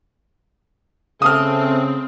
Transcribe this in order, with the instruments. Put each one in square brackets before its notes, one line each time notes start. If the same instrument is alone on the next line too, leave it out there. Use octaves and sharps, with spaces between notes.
[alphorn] C#3 [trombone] A3 [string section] C4 [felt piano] D#6 F6